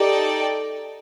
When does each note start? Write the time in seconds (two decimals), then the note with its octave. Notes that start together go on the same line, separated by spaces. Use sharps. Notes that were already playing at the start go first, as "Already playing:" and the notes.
Already playing: D#4 G4 A4 D5 G5